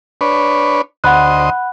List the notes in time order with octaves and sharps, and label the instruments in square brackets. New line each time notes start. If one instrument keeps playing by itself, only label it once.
[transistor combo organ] D4 B4 C#5
[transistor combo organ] D2 C5 D#5 [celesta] F#5 B5 F#6